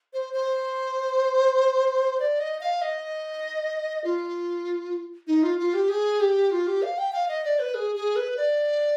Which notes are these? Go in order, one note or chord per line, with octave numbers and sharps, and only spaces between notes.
C5
C5
D5
D#5
F5
D#5
F4
D#4
F4
F4
G4
G#4
G4
F4
G4
F5
G5
F5
D#5
D5
B4
G#4
G#4
B4
D5